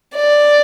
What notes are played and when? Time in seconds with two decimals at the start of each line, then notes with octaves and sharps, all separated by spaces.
0.15 D5